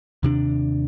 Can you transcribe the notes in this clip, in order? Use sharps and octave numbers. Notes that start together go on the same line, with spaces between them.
D#2 C3 D4